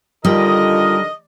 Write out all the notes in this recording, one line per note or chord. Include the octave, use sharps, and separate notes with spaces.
D3 D#3 G3 F4 A#4 D#5